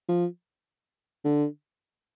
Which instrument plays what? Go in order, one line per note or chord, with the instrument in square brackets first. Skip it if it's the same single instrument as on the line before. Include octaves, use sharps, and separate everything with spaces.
[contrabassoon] F3
D3